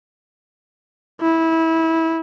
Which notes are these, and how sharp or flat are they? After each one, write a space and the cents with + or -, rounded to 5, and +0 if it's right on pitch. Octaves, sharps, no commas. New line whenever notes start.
E4 -20